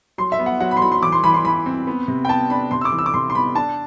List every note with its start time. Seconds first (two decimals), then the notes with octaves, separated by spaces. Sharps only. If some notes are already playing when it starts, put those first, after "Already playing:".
0.18 F#3 C6
0.32 E5
0.39 B3
0.46 F#5
0.60 F#3 F#5
0.71 B5
0.77 C6
0.81 F#3 B5
0.92 C6
1.02 E3 D6
1.12 C6
1.23 E3 B5
1.34 C6
1.44 E3 B5
1.66 C4
1.87 B3
2.08 C3
2.25 G5
2.29 B3 A5
2.50 D4 B5
2.71 C3 C6
2.81 E6
2.85 D6
2.92 E3
2.98 E6
3.06 D6
3.14 C3 C6
3.30 C6
3.35 B3 B5
3.55 D4 A5